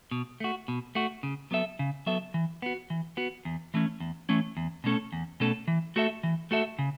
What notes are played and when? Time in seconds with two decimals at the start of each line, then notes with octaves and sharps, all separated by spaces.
0.11 B2
0.40 A3 F#4
0.68 B2
0.95 A3 F#4
1.23 C#3
1.51 F#3 B3 A4 E5
1.79 C#3
2.06 F#3 B3 A4 E5
2.34 E3
2.62 B3 F#4
2.90 E3
3.17 B3 F#4
3.45 E2
3.74 E3 A3 C#4
4.00 E2
4.29 E3 A3 C#4
4.57 E2
4.84 B2 A3 C#4 A4
5.12 E2
5.40 B2 A3 C#4 A4
5.68 E3
5.96 A3 F#4 A4 E5
6.23 E3
6.51 A3 F#4 A4 E5
6.79 C#3